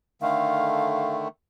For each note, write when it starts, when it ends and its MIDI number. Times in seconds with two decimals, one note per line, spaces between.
0.22 1.28 50
0.22 1.28 51
0.22 1.28 57
0.22 1.16 77